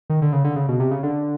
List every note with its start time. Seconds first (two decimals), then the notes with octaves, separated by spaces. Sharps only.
0.10 D#3
0.22 D3
0.33 C#3
0.44 D3
0.56 C#3
0.68 B2
0.80 C3
0.91 C#3
1.03 D3